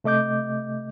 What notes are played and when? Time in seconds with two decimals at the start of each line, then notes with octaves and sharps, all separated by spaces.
0.04 C3 A3 D#5 D6 G6